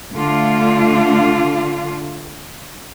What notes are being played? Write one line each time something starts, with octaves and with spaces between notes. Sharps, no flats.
D3 A3 D4 F4